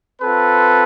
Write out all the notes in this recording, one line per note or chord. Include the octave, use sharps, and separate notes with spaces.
C4 F4 A4 B4